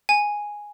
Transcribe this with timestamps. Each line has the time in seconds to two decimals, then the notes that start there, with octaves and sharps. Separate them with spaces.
0.09 G#5